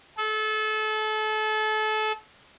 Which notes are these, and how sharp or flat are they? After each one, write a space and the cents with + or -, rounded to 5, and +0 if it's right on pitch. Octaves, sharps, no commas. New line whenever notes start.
A4 -30